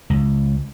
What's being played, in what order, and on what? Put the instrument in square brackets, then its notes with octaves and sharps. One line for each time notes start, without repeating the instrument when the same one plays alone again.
[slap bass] C#2